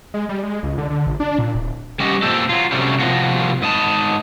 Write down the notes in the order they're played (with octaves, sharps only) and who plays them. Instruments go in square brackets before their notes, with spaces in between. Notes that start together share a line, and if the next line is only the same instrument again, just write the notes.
[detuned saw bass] G#3
G3
G#3
C#2
D3
D3
A#1
D4
A#2
D1
[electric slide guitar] G3 C#4 F#4 G4 D#5
A#2 C4 A4
F#3 F4
C3 F#3 G3 A3 C4 C#4
C3 F3 G#3 A#3 F4 F#4
G#2 D#5 A5